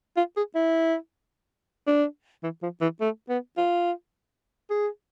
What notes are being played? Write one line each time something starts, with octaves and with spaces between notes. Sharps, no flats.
F4
G#4
E4
D4
E3
F3
E3
A3
B3
F4
G#4